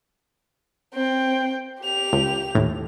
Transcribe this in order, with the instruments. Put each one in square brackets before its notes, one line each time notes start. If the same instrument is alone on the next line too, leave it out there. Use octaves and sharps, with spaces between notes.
[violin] C4 G5
G4 F7
[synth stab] C#2
D#2 A2